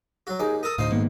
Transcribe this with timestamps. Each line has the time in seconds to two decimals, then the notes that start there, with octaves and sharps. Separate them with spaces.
0.27 F#3 F#4
0.40 D#2 D#4 G#4 D6
0.63 A4 A#4 A#5 D#6
0.78 D2 A2 D#4 C5 F5
0.92 G#2 D#3 A#3 B3